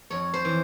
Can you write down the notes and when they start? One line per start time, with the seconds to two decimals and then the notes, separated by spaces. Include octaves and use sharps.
0.10 F2 C#5
0.34 C5
0.45 E3